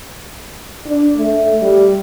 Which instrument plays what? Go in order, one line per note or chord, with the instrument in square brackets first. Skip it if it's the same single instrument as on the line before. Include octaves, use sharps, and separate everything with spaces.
[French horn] D4
A3
G3